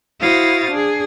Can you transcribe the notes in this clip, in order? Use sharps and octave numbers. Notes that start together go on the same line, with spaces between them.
E4 F#4 C5 F5 D#6 A6
D4 G#4